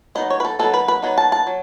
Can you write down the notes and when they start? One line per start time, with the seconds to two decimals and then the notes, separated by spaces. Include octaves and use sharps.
0.15 F#3 B3 D#4 D#5
0.30 C#5
0.40 B4
0.45 A4
0.59 F#3 B3 D#4 A4
0.74 B4
0.88 B4
1.02 F#3 B3 D#4
1.18 A5
1.32 A5
1.47 F#3